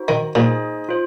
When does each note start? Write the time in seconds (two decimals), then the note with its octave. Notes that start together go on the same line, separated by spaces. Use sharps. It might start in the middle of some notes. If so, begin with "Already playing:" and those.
Already playing: D#4 F#4 C5
0.08 D#3
0.35 A#2 D#4 G#4 C5 D#5 G#5
0.89 F4 C5